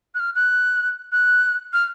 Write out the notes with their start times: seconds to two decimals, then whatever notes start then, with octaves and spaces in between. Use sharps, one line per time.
0.15 F#6
0.20 F6
0.35 F#6
1.12 F#6
1.73 F6